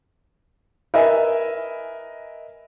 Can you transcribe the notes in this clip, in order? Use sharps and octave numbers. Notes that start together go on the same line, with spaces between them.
A#4 B4 D#5 E5 G#5